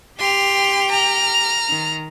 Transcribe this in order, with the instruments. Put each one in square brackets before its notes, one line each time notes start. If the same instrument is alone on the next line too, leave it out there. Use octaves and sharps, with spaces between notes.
[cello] G4 G5 [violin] C6 F7
[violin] A#5 F6
[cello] D#3